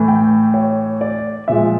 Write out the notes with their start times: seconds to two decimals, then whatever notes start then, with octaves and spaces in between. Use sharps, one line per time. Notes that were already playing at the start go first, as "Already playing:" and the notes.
Already playing: A2 E3 A3
0.08 G5
0.54 C#5
1.01 D5
1.48 A#2 F3 G#3 E5